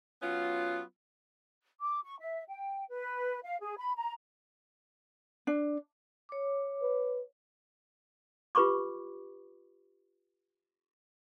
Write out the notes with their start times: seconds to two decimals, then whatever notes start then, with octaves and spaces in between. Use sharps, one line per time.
0.22 F#3 B3 C#4 F4
1.80 D6
2.05 C#6
2.20 E5
2.48 G5
2.91 B4
3.44 F5
3.62 G#4
3.78 B5
3.95 A#5
5.47 D4
6.29 C#5 D6
6.82 B4
8.55 F4 G4 B4 B5 C#6 D6